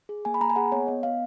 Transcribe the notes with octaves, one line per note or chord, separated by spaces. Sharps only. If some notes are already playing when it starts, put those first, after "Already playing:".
G#4
A#3 G#5
B5
A#3 A#5
G#5
G#4 F#5
B3 C#5
B3 D#5
B3 F5